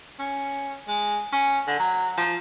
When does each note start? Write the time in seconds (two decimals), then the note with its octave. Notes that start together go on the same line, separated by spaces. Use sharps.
0.19 C#4
0.88 G#3
1.33 C#4
1.67 D3
1.79 F#3
2.17 F3